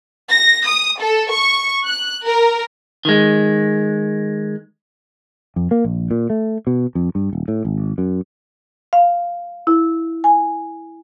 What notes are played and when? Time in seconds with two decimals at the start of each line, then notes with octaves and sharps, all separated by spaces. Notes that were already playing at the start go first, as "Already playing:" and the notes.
0.30 A#6
0.67 D#6
1.00 A4
1.32 C#6
1.85 F#6
2.26 A#4
3.05 D#3 G#3
5.56 F2
5.71 A#3
5.85 A#1
6.11 A#2
6.30 A3
6.67 B2
6.95 F2
7.15 G2
7.33 D#1
7.48 A2
7.65 G#1
7.98 F#2
8.93 F5
9.67 E4
10.24 G#5